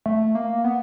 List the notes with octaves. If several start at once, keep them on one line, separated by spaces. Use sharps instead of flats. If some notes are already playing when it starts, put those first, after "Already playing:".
A3
A#3
B3